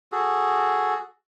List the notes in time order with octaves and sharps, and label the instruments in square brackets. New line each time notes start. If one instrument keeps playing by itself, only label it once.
[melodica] F#4 G#4 A4